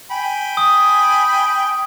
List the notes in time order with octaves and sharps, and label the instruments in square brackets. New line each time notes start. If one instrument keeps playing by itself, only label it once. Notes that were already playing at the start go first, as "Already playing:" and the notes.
[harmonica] G5 G#5 B5
[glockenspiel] D#6